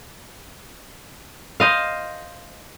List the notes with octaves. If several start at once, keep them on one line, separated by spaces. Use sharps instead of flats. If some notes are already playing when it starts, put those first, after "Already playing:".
C5 D#5 F5